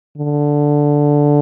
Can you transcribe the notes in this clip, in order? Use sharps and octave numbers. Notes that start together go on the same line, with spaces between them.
D3